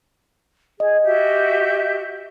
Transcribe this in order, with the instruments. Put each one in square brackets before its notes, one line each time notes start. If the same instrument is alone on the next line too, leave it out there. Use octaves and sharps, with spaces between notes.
[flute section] G#4 [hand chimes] D#5
[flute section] F#4 G4 E5